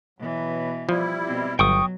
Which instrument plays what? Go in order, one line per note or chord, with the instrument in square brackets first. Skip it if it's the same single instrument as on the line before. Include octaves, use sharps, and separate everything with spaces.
[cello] B2 E3 [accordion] F#3
[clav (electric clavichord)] F3 [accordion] G3 E4
[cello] B2 C4
[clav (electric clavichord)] G1 [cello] F#3 [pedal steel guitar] G5 C#6 D#6